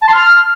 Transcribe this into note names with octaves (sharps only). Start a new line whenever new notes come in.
A5
C6
F6